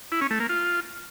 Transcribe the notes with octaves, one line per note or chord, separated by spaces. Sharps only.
E4
C#4
A3
A#3
F4